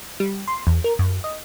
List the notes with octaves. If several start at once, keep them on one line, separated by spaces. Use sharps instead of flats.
G3
C6
E2
A#4
F#2
D#5